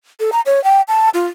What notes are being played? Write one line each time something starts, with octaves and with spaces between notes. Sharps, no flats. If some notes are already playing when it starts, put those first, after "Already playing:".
A4
A#5
C#5
G5
A5
F4